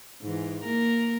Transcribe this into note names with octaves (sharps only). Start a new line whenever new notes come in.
G#2 E3
A#3 A#4